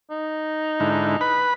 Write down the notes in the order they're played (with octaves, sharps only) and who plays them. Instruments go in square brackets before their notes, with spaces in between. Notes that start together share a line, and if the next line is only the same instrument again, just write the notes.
[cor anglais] D#4
[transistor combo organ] G#2 D3 E4
B4 B5